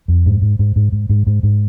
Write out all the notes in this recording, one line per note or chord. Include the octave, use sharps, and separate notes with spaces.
F2
G#2
G#2
G#2
G#2
G#2
G#2
G#2
G#2